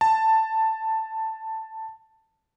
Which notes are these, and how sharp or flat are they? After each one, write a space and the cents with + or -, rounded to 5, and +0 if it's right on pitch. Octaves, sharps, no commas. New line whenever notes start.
A5 +10